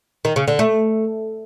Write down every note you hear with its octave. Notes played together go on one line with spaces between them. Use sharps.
D#3
C#3
D3
A3